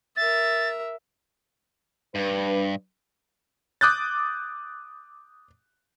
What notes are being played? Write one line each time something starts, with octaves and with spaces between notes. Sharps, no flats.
A#4 E5 A6
G2 D4 B4
D6 D#6 F#6 G6 A6